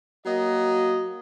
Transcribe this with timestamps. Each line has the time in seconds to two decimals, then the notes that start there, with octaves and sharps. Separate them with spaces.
0.24 F#3 A#3 D#5